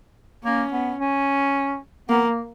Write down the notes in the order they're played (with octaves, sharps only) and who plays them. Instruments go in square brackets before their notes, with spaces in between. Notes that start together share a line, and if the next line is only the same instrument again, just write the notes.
[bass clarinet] A#3 [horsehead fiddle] C#4
[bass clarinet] B3
C#4
[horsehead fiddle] A#3 [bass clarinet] B3
[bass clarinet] A#3